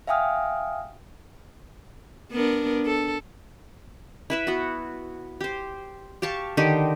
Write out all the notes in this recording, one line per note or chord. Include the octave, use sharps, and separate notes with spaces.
E5 F5 G5 G#5 D#6 F6
B3 D4 A#4
A4
E4 B4 E5
B3 F#4
G4 C5
G4 F5 A5 C#6
D3 D#3 D#4 G4